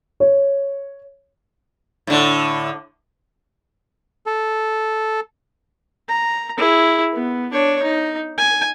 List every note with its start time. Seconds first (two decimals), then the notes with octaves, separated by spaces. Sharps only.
0.20 C#5
2.07 A2 D3
4.26 A4
6.09 A#5
6.57 E4 G#4
7.13 B3
7.52 D4 C#5
7.83 D#4
8.38 G#5